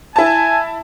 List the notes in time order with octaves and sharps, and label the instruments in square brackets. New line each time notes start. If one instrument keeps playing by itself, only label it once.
[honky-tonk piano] E4 A5 [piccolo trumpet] G#5